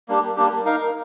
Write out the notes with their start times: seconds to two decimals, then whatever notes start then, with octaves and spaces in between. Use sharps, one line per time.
0.09 G3 A#3 D4 G4
0.36 G3 A#3 D4 G4
0.65 D#4 A#4 F5